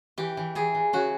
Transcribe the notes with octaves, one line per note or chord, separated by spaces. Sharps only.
E3 G4
E3
E3 G#4
E3
C#3 F#4